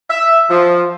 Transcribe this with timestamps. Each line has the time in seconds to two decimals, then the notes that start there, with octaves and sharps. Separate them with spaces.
0.10 E5
0.50 F3